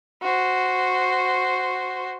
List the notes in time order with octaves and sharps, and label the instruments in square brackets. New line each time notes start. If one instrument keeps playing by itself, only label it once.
[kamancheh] F#4 C5